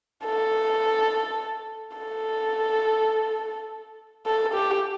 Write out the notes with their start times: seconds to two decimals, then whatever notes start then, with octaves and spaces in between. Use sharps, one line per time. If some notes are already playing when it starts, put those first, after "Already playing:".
0.25 A4
1.97 A4
4.26 A4
4.54 G4